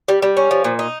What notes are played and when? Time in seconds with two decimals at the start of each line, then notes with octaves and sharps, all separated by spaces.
0.08 G3
0.22 G3
0.37 C#4
0.51 F3
0.64 A#2
0.79 D#4